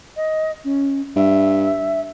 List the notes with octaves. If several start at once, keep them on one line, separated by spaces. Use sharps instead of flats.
D#5
C#4
G2 E5